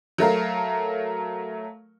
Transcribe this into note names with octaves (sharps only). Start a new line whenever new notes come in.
F#3 A3 A#4 F5